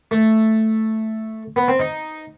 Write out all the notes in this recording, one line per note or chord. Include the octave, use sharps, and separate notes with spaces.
A3
B3
C4
D#4